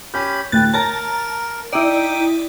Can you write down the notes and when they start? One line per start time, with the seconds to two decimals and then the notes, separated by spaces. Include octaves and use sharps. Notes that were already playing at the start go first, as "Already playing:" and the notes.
0.14 C#4 G4 B5 G6
0.52 A1 D2 B4 G5 A6
0.74 A#4 C#5 A5 A#5
1.73 D#4 E4 D5 G5 D#6